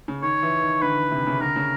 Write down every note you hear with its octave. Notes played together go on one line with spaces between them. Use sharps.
C#3
D#3 C#5
E3
D#3
D3 B4
C3
C#3
D3 A#4
C#3